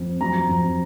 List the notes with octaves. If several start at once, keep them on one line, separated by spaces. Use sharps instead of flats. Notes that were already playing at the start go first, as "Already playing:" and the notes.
Already playing: F2
F#3 A#5
F2